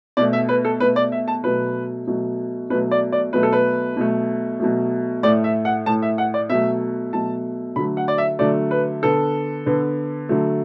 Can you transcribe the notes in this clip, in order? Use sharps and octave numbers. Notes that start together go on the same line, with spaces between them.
B2 A3 D5
E5
B4
A4
B2 A3 B4
D5
E5
A5
B2 F#3 A3 B4
B2 F#3 A3
B2 F#3 A3 B4
D5
D5
B2 F#3 A3 B4
A4
B4
B2 F#3 A3
B2 F#3 A3
A2 A3 D5
E5
F#5
A2 A3 A5
E5
F#5
D5
B2 F#3 A3 E5
B2 F#3 A3 A5
D3 F#3 A3 B5
F#5
D5
E5
D3 F#3 A3 D5
B4
D3 B3 A4
D3 B3
D3 F#3 A3